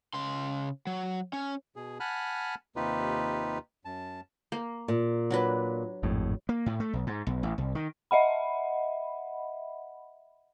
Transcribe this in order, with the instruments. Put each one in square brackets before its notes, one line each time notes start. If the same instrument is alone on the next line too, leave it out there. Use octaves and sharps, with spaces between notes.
[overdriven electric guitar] C#3 C6
F#3
C#4
[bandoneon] B2 G#4
F#5 G#5 A5 B5 F6 F#6
D#2 C3 D#4 F4 G4 B4
F#2 A5
[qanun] A#3
[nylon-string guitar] A#2
[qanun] F#3 D4 B4
[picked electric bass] G#1 F2 A2
[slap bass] A#3
A2
A3
B1
G#2
B1
A1
C2
D#3
[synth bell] D#5 E5 F#5 B5